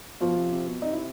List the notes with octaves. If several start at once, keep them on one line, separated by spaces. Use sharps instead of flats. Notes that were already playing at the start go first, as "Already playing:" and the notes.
B2 F3 F4
C3
C3
B2
C3 D#4
E4